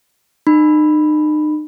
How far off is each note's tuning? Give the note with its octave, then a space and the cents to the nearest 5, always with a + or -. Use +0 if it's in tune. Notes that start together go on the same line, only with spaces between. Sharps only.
D#4 -40 B5 +0